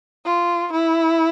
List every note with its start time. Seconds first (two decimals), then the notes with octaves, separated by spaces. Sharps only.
0.25 F4
0.72 E4